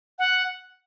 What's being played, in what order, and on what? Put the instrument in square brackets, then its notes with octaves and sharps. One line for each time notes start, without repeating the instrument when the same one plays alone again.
[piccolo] F#5